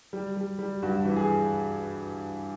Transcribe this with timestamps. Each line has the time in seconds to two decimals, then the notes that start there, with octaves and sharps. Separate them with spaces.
0.13 G3
0.36 G3
0.59 G3
0.82 G2 F#4
1.05 E3
1.17 G#4